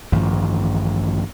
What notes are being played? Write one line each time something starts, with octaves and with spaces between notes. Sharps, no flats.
A1 G2 D#3 F3